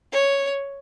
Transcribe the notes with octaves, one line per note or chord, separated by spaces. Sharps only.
C#5